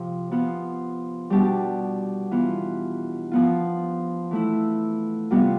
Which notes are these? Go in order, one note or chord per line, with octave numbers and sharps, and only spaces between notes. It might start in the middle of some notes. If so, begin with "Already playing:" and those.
Already playing: C3 F3
F3 B3 F4
B2 G3 D4 G4
E3 B3 F4
F3 B3 F4
E3 A3 E4
C3 G3 B3 F4